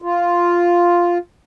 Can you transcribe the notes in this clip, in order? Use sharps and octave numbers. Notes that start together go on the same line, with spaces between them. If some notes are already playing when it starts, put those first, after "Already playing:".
F4